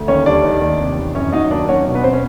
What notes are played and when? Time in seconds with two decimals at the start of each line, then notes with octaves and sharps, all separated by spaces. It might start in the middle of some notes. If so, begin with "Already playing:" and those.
Already playing: D2
0.08 D#2 C#4 C#5
0.26 G3 D4 D5
0.45 D#3
0.62 D#2
0.80 C3
0.97 E2
1.15 F#2 C#4 C#5
1.33 F#3 D#4 D#5
1.51 D#2 D4 D5
1.69 F#3 C#4 C#5
1.86 B2
1.95 B3 B4
2.04 C4 C5
2.13 C#4